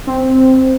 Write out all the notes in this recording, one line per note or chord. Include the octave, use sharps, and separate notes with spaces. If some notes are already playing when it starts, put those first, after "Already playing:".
C4